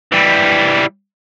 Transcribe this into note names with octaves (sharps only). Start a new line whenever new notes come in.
E3 G3